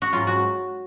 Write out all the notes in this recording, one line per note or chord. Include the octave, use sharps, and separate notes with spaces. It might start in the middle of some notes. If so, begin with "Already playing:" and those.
F#4
G#2 F#3 F4
F#4